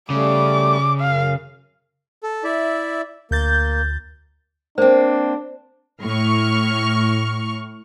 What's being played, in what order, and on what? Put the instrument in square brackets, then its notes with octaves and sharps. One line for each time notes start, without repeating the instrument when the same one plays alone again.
[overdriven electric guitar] C#3 [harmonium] G3 A3 [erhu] D6
[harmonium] F#2 [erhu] F5
[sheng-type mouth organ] A4
E4 D5 E5
[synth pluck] D2 G6 A6 [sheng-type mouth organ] A#3
[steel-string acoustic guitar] A#3 C4 [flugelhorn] D4 [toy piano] C5
[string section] A2 C#6 F6